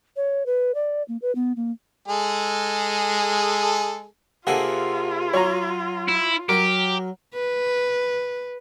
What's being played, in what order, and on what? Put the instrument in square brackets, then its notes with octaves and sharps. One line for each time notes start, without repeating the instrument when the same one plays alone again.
[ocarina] C#5
B4
D5
A#3
B4
B3
A#3
[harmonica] G#3 G#4 A4
[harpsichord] C3 A#3 G#4 [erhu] F4 [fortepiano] A4 F#5
[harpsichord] F#3 [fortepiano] C#5 A#5
[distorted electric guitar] E4
[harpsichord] F#3 [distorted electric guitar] G4 [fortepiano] A#4
[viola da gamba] B4